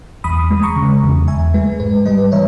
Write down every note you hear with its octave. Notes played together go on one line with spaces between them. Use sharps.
E2 B5 D#6
G#3
A#5 C#6
C#3
E2
E2 E5 G#5
G#3 B4
G#2 B4
G3 B4 D#5
E3 C#5 E5